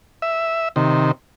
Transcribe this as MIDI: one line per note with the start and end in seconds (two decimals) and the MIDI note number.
0.22 0.69 76
0.76 1.11 48
0.76 1.11 51